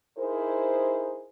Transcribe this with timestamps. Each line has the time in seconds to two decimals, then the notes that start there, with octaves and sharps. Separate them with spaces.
0.18 D#4 E4 G#4 A#4 C5